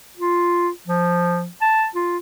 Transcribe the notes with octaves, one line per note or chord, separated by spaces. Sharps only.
F4
F3
A5
F4